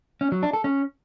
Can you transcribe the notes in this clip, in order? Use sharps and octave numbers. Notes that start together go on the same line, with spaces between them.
C#4
F#3
D4
A4
C#4